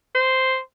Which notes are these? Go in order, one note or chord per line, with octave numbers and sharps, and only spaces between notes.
C5